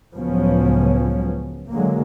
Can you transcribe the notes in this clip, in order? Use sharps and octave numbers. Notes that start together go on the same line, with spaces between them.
C#2 A2 F3 F#3 B3 C#4
D3 F#3 G#3 A#3